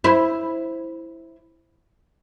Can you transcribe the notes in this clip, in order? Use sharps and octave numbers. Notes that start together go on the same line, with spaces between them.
E4 C5